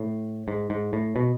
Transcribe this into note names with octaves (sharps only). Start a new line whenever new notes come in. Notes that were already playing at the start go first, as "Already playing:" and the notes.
Already playing: A2
G#2
G#2
A2
B2